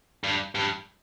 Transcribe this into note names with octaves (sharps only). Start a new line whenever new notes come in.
G2
G2